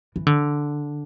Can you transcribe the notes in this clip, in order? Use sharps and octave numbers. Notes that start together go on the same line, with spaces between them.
E3
D3